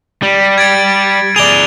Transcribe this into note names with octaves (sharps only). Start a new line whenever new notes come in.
G3
G#6 A6 D7
G#4 D5 F7 G7